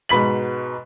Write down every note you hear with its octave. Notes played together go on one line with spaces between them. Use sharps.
G#2 B2 B5 B6 F#7